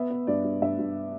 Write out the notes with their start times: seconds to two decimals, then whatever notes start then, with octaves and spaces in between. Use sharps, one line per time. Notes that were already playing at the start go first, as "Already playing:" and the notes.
Already playing: B3 E5
0.11 B3
0.27 G2 D5
0.44 G2
0.62 G2 E5
0.79 G2